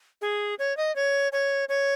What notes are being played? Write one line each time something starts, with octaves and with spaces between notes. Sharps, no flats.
G#4
C#5
D#5
C#5
C#5
C#5